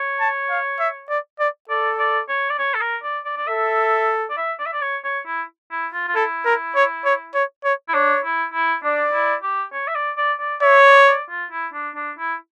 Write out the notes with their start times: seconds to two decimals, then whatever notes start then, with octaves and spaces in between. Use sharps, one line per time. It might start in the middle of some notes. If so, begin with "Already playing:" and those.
Already playing: C#5
0.20 A5
0.50 F5
0.79 E5
1.10 D5
1.40 D5
1.69 A4 D5
1.99 D5
2.29 C#5
2.50 D5
2.59 C#5
2.74 A4
2.81 A#4
3.03 D5
3.25 D5
3.37 D5
3.47 A4 E5
4.30 D5
4.37 E5
4.59 D5
4.66 E5
4.73 D5
4.82 C#5
5.04 C#5
5.26 E4
5.71 E4
5.94 F4
6.08 F4
6.15 E4 A4
6.45 A#4
6.75 C#5
7.05 C#5
7.35 C#5
7.65 C#5
7.89 E4
7.94 D4 C#5
8.24 E4
8.54 E4
8.84 D4 D5
9.13 E4
9.43 G4
9.73 C#5
9.88 E5
9.96 D5
10.17 D5
10.40 D5
10.62 C#5 E5
10.85 D5
11.07 D5
11.30 F4
11.51 E4
11.74 D4
11.96 D4
12.19 E4